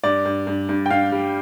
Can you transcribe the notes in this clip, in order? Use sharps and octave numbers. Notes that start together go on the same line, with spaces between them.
G2 D5
G2
G2
G2
G5
G2 F5
G3